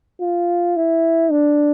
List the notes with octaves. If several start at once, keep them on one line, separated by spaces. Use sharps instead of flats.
F4
E4
D4